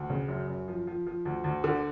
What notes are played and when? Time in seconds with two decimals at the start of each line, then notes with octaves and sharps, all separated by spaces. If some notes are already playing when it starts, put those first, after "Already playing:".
Already playing: D2
0.10 C#3
0.28 F#2
0.48 F#2
0.68 F3
0.87 F3
1.07 F3
1.25 D2
1.44 D2
1.64 D3